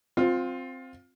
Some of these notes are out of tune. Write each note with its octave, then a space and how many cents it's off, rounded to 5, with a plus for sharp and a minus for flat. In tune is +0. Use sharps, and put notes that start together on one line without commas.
C4 +0 F4 +20